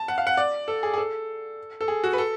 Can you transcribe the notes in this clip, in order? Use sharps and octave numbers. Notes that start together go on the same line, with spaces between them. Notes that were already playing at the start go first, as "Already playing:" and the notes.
Already playing: A5
F#5
F5
F#5
D5
A4
G#4
G#4
A4
A4
G#4
F#4
B4
A4